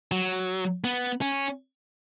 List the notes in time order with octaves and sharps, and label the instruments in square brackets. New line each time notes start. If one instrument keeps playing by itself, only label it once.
[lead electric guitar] F#3
B3
C#4